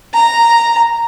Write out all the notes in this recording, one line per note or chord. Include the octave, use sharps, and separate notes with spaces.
A#5